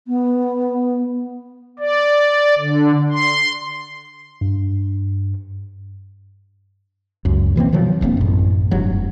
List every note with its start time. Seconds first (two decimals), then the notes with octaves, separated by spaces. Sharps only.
0.08 B3
1.79 D5
2.59 D3
3.12 C6
4.41 G2
7.25 C#2 F#2
7.56 B2 E3 A#3 C4
7.73 B2 D#3 F3 F#3
8.01 D#1 A#1 A#3 C4
8.17 A1 F#2
8.71 F1 G2 F#3